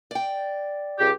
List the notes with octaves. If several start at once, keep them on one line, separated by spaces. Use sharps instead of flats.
D5 G5
C#2 G4